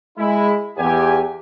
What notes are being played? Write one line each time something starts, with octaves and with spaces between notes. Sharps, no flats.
G#3 E4
E2 G4 G#5